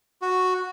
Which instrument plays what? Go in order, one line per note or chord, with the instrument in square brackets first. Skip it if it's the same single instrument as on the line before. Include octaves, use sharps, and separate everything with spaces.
[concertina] F#4